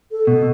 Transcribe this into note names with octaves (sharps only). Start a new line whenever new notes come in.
A4
B2